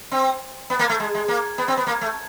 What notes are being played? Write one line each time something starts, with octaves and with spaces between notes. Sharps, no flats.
C4
B3
A#3
A3
G#3
G#3
A#3
B3
C4
B3
A#3
A3